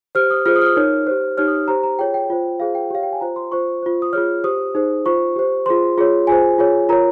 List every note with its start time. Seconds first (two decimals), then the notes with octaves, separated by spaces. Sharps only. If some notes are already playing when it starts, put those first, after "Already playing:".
0.15 G4 C5 F6
0.30 D#6
0.46 F4 G#4 C5 F6
0.56 D#6
0.61 F6
0.66 D#6
0.76 D#4 A#4 C#5 F6
1.07 G4 C5
1.37 D#4 G4 C#5 F6
1.47 D#6
1.68 G4 C5 A#5
1.83 A#5
1.99 F4 G#4 C#5 G5
2.14 G5
2.30 F4 C5
2.60 F4 G#4 C5 F5
2.75 G5
2.90 G4 C#5 F5
3.03 G5
3.13 G#5
3.21 F4 C5 A#5
3.36 C6
3.52 F4 C5 C#6
3.83 F4 C5
4.02 D#6
4.13 F4 G#4 C#5 F6
4.44 G4 C5 D#6
4.75 D#4 G#4 C5
5.06 F4 C5 C#6
5.36 G4 C5
5.66 F4 G#4 C5 C6
5.97 F4 G#4 C#5
6.27 F4 G#4 C5 G#5
6.58 F4 G#4 C#5
6.89 F4 A#4 C#5 A#5